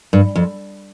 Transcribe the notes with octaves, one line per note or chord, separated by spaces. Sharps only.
G2
F2